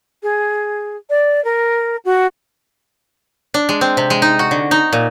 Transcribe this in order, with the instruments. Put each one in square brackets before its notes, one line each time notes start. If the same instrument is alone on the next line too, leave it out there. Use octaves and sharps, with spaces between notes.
[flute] G#4
D5
A#4
F#4
[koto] D4
G#3
C4
C3
G#3
D#4
F#4
D3
D#4
A#2